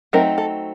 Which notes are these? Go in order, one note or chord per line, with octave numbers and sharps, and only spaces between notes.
F#3 A3 C4 D#4 A#4
A4